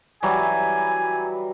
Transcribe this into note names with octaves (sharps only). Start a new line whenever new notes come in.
E3 F#3 G3 G#5